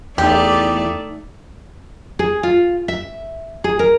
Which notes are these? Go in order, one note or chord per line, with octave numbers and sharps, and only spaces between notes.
E2 A3 D#4 G4 D5
G#4
F4
E5
G#4
A#4